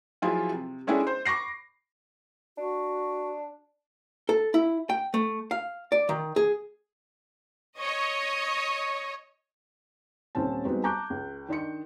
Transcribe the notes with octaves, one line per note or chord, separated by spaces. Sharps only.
F3 F#3 E4 F4 G#4
C3
G#3 C#4 D4 E4 G#4 A4
C5
B5 C#6 D6 A#6 C7
D4 F#4
A4
E4
G5
A3
F5
D5
D#3
G#4
C#5 D#5
D#1 C4 C#4 A5
G3 G#3 B3 C4 D#4 F#4
A5 A#5 C#6 D6 F#6 G6
C#2
D#3 D4 D#5 C6 C#7